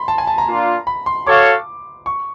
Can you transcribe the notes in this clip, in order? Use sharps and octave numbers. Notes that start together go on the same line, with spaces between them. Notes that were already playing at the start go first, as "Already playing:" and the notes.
Already playing: B5 C6
A5
G#5
A5
A#5
A#3 D4 F4
B5
C6
F#4 A4 C#5 F5 D6
C#6